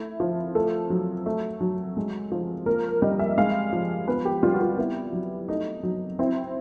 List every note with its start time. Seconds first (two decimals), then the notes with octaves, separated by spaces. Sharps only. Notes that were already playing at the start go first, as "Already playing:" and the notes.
Already playing: A3 E4
0.20 F3
0.55 A3 A4
0.90 F#3
1.26 A3
1.61 F#3
1.97 G#3
2.32 F3
2.66 A#3 A#4
3.02 G3 D#5
3.19 E5
3.38 G#3 F5
3.73 F3
4.08 B3 B4
4.25 G4
4.43 G3 F4
4.54 F#4
4.60 F4
4.78 B3 E4
5.13 F#3
5.49 A3 D#4
5.83 F#3
6.19 C4 E4